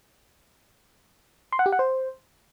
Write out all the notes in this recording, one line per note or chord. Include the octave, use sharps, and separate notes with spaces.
C6
F#5
G4
F#5
C5